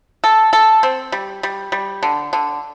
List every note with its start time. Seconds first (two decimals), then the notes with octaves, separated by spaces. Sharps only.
0.24 A4
0.53 A4
0.83 C4
1.12 G3
1.43 G3
1.72 G3
2.03 D3
2.33 D3